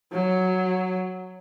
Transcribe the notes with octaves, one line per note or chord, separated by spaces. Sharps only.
F#3